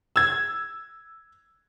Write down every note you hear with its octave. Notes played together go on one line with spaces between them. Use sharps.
E6 G#6